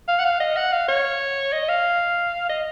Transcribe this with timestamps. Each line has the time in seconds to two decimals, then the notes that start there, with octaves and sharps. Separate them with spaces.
0.08 F5
0.19 F#5
0.25 F5
0.40 D#5
0.56 F#5
0.73 F5
0.88 C#5
1.53 D#5
1.69 F5
2.49 D#5